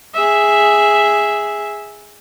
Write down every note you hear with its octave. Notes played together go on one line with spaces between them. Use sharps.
G#4 E5